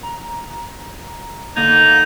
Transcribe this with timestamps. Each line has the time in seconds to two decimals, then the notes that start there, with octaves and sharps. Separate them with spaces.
0.03 A#5
1.56 D3 A#3 D#4 G#6